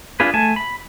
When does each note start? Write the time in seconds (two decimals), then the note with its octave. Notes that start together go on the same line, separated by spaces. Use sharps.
0.20 D4 F4 G#4 B4
0.34 A3 G#5 A5
0.56 B5